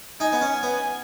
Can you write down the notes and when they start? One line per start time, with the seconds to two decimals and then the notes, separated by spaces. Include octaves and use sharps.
0.20 D#4 G#5
0.32 B3
0.41 C#4
0.53 G#5
0.63 B3